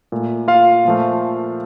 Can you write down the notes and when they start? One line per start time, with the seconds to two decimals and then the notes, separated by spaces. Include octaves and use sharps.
0.12 A#2 A3
0.48 F4 F5
0.85 A#2 F3 A3